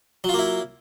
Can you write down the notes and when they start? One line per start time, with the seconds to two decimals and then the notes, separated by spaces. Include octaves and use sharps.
0.24 F#3
0.29 F4
0.34 A#3
0.39 E4